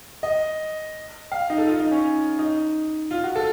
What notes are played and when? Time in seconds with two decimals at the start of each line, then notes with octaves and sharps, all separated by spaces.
0.23 D#5
1.32 F5
1.50 D#4
1.58 A4
1.67 F4
1.79 D#4
1.91 C#4
2.39 D#4
3.11 F4
3.24 F#4
3.36 A4